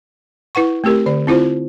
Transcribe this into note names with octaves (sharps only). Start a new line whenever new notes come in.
E4 B4 F#5 C#6
A3 C4 G4 A#4
D3 D5
C4 E4 F4 C5